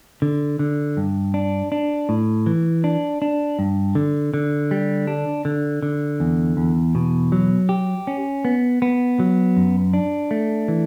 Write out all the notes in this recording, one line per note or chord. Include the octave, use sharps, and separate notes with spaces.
D3
D3
G2
D4
D4
A2
E3
D4
D4
G2
D3
D3
G3
D4
D3
D3
E2
E2
B2
F#3
G4
C#4
B3
B3
F#3
F#2
D4
A3
E3